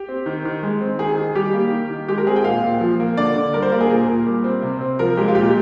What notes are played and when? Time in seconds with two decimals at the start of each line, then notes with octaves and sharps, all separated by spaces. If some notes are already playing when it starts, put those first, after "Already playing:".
Already playing: G4
0.09 C4
0.26 D#3
0.45 D#3
0.63 G#3
0.81 C4
0.99 D#3 G#4
1.18 D#3
1.35 G3 G4
1.54 A#3
1.72 D#3
1.90 D#3
2.08 G#3 G4
2.18 A#4
2.27 C4 G#4
2.36 G5
2.44 A#2 F5
2.63 A#2
2.81 F3
3.00 A#3
3.17 D3 D5
3.36 D3
3.53 G3 A#4
3.62 C5
3.72 A#3 A#4
3.81 G#4
3.90 A#2 A#4
4.08 A#2
4.26 G3
4.44 C4
4.63 C3
4.81 C4
4.99 F3 A#4
5.17 G#3 G4
5.28 F4
5.35 A#2 G4